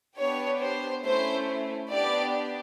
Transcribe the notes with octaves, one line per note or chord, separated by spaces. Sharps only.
B3 D4 G4 C#5
C5
A3 C#4 E4 C5
B3 D4 G4 D5